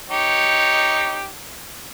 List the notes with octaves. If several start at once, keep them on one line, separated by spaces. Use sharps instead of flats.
D#4 G4 C#5